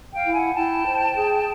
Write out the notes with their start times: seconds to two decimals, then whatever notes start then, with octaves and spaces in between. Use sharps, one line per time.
0.14 F5 G5
0.24 E4
0.34 F#5 G#5
0.54 E4 G5 A5
0.85 C5
1.16 G#4